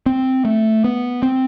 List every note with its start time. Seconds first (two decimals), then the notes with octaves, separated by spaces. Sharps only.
0.06 C4
0.45 A3
0.84 B3
1.23 C4